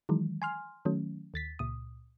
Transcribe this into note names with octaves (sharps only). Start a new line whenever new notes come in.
D#3 E3 F#3 G#3
G#5 C6 F6
D#3 F#3 A3 C#4
D#2 A6 B6
C#2 A#2 D#6